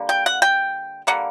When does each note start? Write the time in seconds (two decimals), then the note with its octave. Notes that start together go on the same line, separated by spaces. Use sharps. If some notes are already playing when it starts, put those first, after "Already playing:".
Already playing: D3 G3 A#3
0.09 G5
0.26 F#5
0.42 G5
1.07 D3 G3 A#3 F#5